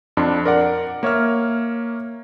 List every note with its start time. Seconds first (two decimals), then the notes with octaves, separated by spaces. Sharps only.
0.17 F2 D4 C6
0.45 A#4 D5 F#5
1.03 A#3 C#5 E5 F6